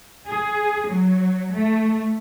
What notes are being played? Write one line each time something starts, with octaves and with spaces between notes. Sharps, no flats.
G#4
F#3
A3